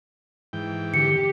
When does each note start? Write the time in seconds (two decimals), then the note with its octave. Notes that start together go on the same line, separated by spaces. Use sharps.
0.53 G#2 E3 G5
0.94 D3 G4 C#7